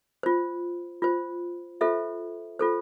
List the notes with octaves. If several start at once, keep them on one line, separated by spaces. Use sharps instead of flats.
F4 C5
F4 C5
F4 A4 C5 E5
F4 A4 C5